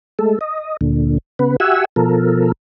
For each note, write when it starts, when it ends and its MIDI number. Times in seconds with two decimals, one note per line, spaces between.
0.19 0.39 56
0.19 0.39 57
0.19 0.39 69
0.41 0.77 75
0.81 1.18 38
0.81 1.18 46
0.81 1.18 50
1.39 1.56 49
1.39 1.56 59
1.39 1.56 71
1.60 1.85 66
1.60 1.85 67
1.60 1.85 76
1.60 1.85 78
1.60 1.85 80
1.60 1.85 88
1.96 2.52 47
1.96 2.52 53
1.96 2.52 69
1.96 2.52 70